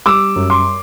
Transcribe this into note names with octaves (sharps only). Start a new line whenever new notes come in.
G3 D6 E6
F#2
C6 D6